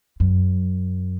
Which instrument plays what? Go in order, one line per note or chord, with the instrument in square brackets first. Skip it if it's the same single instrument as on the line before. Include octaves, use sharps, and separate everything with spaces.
[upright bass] F#2